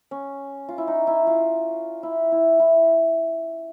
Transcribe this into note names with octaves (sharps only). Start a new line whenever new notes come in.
C#4
F4
E4
D#4
E4
F4
E4
E4
E4